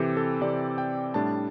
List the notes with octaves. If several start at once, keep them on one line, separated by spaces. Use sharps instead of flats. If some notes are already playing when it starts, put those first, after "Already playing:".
Already playing: C3 E3 C4 G4 A4
A4
C3 E3 C4 D5
G5
A2 G3 D4 A5